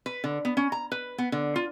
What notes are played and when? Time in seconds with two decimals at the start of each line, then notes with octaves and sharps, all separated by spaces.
0.06 B4
0.24 D3
0.45 B3
0.57 C#4
0.72 A#5
0.92 B4
1.18 B3
1.32 D3
1.56 F4